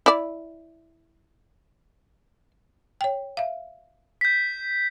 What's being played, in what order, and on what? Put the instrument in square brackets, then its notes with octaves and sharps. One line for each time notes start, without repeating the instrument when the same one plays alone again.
[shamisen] E4 D5
[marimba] C#5 G5
E5 F5
[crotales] G6 B6